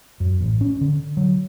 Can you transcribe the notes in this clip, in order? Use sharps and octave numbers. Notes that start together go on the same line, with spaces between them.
F#2
A1
C#4
D3
F#3